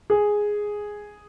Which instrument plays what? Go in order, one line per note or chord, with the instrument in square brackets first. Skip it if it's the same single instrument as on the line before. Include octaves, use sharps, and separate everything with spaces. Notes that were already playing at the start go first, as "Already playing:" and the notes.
[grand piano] G#4